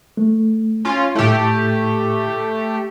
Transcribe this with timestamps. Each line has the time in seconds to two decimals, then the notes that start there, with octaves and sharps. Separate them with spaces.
0.17 A3
0.85 C#4 F4
1.15 A2 A3 E4 G4